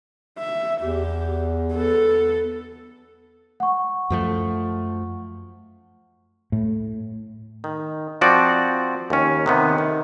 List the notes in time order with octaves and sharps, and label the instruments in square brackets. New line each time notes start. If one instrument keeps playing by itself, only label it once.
[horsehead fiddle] E5
[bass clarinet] E2 [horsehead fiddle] G4
[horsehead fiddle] B3 A4
[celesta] F#5 C#6
[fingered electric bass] F#2 F3 A3
[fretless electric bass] A2
[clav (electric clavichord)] D#3
F3 C4 F#4 D5
D#2 C#4
C3 D#3 B3
D#3